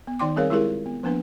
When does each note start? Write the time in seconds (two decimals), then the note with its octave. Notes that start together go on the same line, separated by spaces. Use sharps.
0.07 B3
0.19 D#3 D#4 D5 G5 C6 D6
0.36 G3 C4 G#4 A#4 C#5 F5
0.50 G#3 E4 F4 G4 G#4 A#4
0.86 B3
1.03 F3 A#3 B3 D4 B4